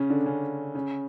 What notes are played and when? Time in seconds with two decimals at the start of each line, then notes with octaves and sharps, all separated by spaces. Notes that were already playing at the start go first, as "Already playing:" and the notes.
Already playing: C#3 C#4
0.10 D3 D4
0.26 C#3 C#4
0.75 C#3 C#4